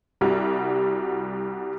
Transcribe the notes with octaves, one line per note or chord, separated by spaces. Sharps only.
C2 G3 F#4